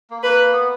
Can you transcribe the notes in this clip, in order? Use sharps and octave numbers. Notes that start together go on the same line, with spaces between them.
A#3
A#3 B4
B3